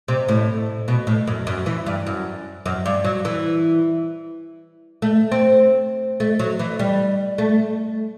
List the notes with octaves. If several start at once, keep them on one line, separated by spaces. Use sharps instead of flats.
C3
A2
B2
A2
F#2
F#2
E3
G2
F#2
F#2
G2
F#3
E3
A3
C4
A3
F#3
E3
G3
A3